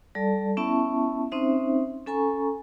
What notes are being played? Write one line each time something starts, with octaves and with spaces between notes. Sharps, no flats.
G3 A4 D5 A5
B3 C#4 E4 E5 A5 C#6
C4 C#4 D#4 C5 E5
C#4 A4 G#5 A#5 C#6